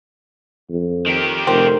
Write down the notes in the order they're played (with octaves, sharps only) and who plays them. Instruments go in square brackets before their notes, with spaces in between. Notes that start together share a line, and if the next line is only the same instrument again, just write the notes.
[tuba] F2
[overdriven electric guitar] D#3 G4
[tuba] F1 [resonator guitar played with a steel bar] C4 [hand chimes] A#4 C6